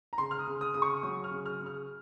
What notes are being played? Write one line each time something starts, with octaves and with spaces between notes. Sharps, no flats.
A#5
C#3 C6
F6
D#6
C#3
D#6
C#3 D#6
C#6
F#3 D#6
F6
C#3
F6
C#3
F6